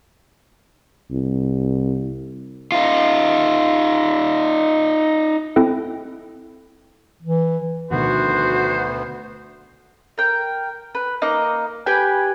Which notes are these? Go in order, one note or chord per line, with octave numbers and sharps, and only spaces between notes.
C2
D#4 F4
C4 E4 A4
E3
D2 B2 D3 D#3 F3 B3 F#4 C5
A#4 G5
B4
A#3 D#4 D#5 D6
G4 B4 G5 G#5